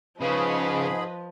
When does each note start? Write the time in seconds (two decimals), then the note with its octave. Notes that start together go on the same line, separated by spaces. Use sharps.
0.21 G#2 C#3 F3 G#4 B4 D#5 B5